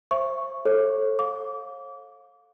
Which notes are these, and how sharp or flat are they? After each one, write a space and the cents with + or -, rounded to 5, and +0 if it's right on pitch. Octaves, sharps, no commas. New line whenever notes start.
C5 +25 E5 +25 C#6 +0
A4 +0 C#5 -40
F5 +25 D6 -30